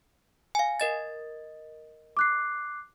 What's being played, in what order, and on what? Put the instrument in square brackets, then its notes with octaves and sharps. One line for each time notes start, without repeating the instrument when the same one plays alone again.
[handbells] F5 G#5
A#4 D#5 A6
[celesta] D6 F#6 C7